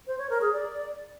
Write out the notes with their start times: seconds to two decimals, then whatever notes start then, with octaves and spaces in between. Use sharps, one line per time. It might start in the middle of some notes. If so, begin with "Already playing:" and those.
0.07 C5
0.19 C#5
0.30 A#4
0.41 G#4
0.53 D5